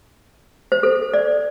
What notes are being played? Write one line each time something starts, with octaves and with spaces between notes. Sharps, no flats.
C5
A4
D5